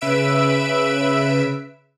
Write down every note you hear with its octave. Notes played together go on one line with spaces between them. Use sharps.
C#3 B4 E5 E6 D7